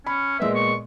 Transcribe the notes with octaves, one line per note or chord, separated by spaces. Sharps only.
C#4 B5
A#2 G#3 B3 E5
C#6